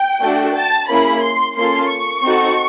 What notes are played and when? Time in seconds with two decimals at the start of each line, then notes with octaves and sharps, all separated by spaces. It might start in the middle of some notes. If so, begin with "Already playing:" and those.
Already playing: G5
0.22 A3 D4 F#4 A4
0.55 A5
0.89 A#3 C#4 E4 G#4 B5
1.22 C6
1.57 A#3 C#4 F4 A4 C6
1.90 C#6
2.23 C4 D#4 F#4 A4